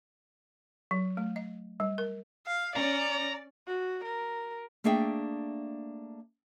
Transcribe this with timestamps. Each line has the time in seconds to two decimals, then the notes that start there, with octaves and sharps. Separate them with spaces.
0.91 F#3
1.17 A3
1.36 D#5
1.80 G3
1.98 A#4
2.47 F5
2.76 C#4 D5 A#5
3.68 F#4
4.05 A#4
4.84 A3 A#3 D4 G#4 E5 G5